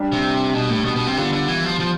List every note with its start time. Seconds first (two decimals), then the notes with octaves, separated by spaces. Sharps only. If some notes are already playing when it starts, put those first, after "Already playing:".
Already playing: G3 D4 G4
0.12 C3
0.54 B2
0.70 A2
0.85 B2
0.96 B2
1.07 C3
1.17 D3 G3 B3 F4
1.33 D3
1.48 E3
1.64 F3
1.80 F3